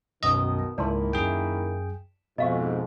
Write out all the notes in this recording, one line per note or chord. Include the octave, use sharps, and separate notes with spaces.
B1 F#2 B2 D#3 D#5 D#6
C#2 G#2 D#3 A#3 E4 D5 A5 C6
F#2 G#4 G5
F2 G#2 B2 D#5 F5 C#6